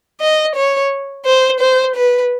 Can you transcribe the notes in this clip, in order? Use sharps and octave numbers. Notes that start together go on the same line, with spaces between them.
D#5
C#5
C5
C5
B4